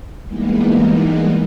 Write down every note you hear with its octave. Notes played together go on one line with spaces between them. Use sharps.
E3 G3 G#3 A#3 B3 D#4